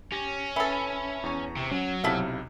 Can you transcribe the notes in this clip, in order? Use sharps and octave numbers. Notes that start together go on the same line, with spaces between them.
C#4 G4 A#6
E3 A4 E5 B5
E2 A#5 C#6
C3
F#3 C#4
B1 C3 E4 A4 F5